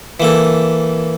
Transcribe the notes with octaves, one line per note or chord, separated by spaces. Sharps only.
E3 A#3 A4